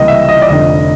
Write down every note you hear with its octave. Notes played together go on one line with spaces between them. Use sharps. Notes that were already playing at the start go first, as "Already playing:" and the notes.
Already playing: C#2 C3 E3 G3 A#3 D#5
E5
D#5
D5
F1 F2 D3 D#5